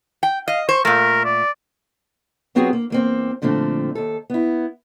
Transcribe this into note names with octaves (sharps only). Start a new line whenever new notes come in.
G5
D#5 F5
C5 C#6
A#2 A3 A#4
D5
F#3 B3 C4 F4 F#4 G#4
A#3
E2 A#3 C4
A#2 D3 F3 A3 C4
D#2 A4
B3 E4